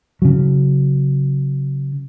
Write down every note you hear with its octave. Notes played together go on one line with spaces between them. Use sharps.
C#3 F#3